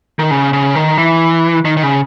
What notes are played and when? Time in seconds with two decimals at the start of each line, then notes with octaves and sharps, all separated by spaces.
0.19 D#3
0.31 C#3
0.53 C#3
0.75 D#3
0.98 E3
1.65 D#3
1.77 D#3
1.82 C#3